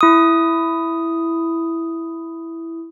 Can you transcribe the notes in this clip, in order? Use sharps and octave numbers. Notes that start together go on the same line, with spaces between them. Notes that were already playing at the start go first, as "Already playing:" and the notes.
E4 D#6